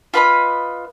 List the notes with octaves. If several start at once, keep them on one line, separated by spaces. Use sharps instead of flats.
F4 B4 D#5 B5